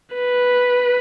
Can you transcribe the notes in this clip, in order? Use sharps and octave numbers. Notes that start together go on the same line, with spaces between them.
B4